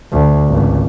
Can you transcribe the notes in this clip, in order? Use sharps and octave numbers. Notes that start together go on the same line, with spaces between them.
D2
G#1 C#2